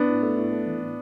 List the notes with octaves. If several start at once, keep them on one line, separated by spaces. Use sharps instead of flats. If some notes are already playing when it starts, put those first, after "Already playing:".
Already playing: B3 D4
A2
A3
A2
A3
E3
A2